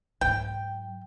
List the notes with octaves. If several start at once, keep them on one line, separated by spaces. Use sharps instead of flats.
G#2 F#3 G5